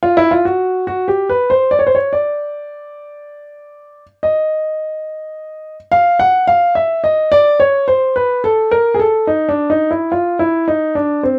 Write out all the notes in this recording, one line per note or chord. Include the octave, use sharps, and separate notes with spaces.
F4
E4
F4
F#4
F#4
G4
B4
C5
D5
C#5
C5
C#5
D5
D#5
F5
F#5
F5
E5
D#5
D5
C#5
C5
B4
A4
A#4
G#4
A4
D#4
D4
D#4
E4
F4
E4
D#4
D4
C4